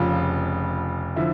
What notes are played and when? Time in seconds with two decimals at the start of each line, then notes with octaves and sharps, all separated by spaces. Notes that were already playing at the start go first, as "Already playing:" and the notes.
Already playing: F1 F2 C#3 F4
1.16 D3 F3 E4